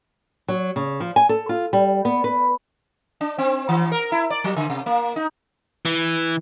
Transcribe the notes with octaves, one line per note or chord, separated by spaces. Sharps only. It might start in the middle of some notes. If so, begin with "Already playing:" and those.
F#3
C#3
F3
G#5
A4
F4
G3
B3
B4
D4
C4
E3
A#4
E4
D5
F#3
D3
C3
A#3
D#4
E3